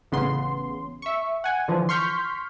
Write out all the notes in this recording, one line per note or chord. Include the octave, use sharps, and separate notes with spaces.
A1 C#3 B3 C6
E5 C#6
F#5 G#5
D3 E3 F3
C6 C#6 F6 G6 B6